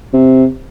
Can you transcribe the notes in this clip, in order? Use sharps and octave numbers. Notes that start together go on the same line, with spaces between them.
C3